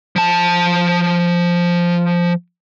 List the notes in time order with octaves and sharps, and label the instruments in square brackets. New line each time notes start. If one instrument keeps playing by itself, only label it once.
[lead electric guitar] F3 A5